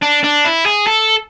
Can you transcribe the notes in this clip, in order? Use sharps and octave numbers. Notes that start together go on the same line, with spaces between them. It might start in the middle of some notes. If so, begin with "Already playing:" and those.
D4
D4
E4
G#4
A4